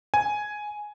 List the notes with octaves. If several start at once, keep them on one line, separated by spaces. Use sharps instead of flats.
G#5